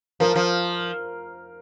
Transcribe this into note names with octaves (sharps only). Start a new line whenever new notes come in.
F3 A#4
F3